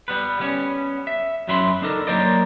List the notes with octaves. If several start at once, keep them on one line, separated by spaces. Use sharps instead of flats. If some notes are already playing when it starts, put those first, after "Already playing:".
G3 B3 B4
G3 B3 C#4
E5
F#2 F#3 E5 B5 C6
D4 D#4 A4 A#4
F#3 A#3 A#4 C5 D5 D#5